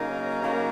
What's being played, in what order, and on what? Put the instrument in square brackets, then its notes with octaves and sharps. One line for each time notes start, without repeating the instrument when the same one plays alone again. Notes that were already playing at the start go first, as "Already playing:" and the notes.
Already playing: [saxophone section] C#3 F#3 A#3 D#4 A#4
C#3 F#3 A#3 D#4 A#4